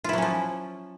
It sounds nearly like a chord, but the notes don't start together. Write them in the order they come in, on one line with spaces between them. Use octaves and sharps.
F4 E4 F#3 C#4 F3